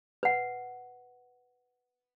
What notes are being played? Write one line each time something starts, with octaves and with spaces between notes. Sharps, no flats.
B4 F#5